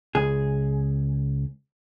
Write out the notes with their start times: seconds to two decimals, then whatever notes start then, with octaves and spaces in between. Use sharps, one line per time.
0.15 C#2 G#4